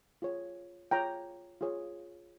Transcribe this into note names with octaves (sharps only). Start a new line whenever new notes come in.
F4 G#4 C#5
F4 G#4 C#5 G5 A#5
F4 G#4 C#5